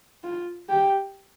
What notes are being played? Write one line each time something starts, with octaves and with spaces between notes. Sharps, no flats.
F4
G4